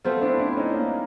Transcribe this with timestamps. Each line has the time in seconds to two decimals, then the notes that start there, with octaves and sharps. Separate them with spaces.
0.04 A3 B3 C4 F4
0.21 D4 E4
0.39 D4 E4
0.53 D4
0.57 C#4 D#4
0.75 A#3